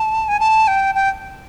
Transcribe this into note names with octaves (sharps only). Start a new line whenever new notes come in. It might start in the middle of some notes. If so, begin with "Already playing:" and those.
Already playing: A5
G#5
A5
G5
G5